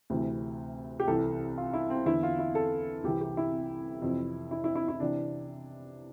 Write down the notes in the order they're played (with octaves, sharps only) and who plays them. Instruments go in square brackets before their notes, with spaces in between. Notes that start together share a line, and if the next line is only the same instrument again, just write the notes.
[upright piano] D2 C3 E3
G4
C2 C3 E3 A4
F4
E4
C4
E2 D3 E4
F4
E4
A4
C2 C3 E3 G4
G4
E4
F2 C3 E3
E4
E4
E4
E4
C3 E3 D4